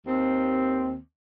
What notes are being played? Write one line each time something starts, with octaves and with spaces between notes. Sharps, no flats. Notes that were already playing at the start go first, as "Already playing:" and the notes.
D#2 C4